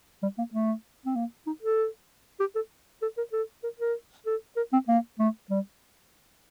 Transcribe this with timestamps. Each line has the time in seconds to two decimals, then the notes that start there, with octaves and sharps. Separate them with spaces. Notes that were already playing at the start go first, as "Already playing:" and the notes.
0.23 G3
0.38 A#3
0.54 A3
1.06 C4
1.16 A#3
1.47 D#4
1.62 A4
2.40 G4
2.55 A4
3.02 A4
3.17 A#4
3.33 A4
3.64 A#4
3.79 A#4
4.26 A4
4.57 A#4
4.73 C4
4.88 A#3
5.19 A3
5.50 G3